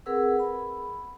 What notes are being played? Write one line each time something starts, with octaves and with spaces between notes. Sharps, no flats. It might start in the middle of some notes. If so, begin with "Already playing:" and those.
C4 G#4 A#4 B4 F#5 E6
B5